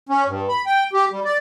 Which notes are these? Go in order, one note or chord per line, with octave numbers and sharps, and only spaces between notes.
C#4
G2
B5
G5
G4
G3
D5